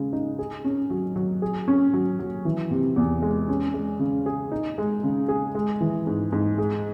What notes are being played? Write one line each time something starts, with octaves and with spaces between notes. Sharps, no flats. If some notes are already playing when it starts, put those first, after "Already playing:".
Already playing: C#3 G#3
D#4
G#4
C#4
F#3
F#3
G#4
C#4
F#3
F#3
E3
C3
E2
G#3
C#4
G#3
C#3
G#4
D#4
G#3
C#3
G#4
G#3
E3
G#2
G#2
G#3